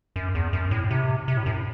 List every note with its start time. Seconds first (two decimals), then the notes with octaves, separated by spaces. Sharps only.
0.16 F#2
0.35 E2
0.53 F#2
0.71 A2
0.91 C3
1.28 C3
1.37 A2
1.46 F#2